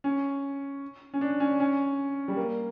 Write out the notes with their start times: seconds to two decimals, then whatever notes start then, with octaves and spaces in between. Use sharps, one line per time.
0.04 C#4
1.14 C#4
1.21 D4
1.40 C#4
1.60 C#4
2.28 G3
2.37 A#3